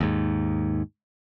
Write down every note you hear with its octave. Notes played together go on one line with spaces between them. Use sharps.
D#2 G#2